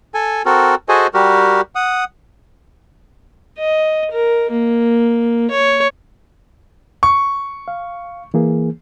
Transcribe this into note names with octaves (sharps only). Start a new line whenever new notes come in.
A4 G#5
C4 F#4 A4 A#4
F#4 G#4 A4 C5 D#5 G#5
G3 F#4 G4 A#4
F#5 D#6
D#5
A#4
A#3
C#5
C#6
F5
E3 A#3 G#4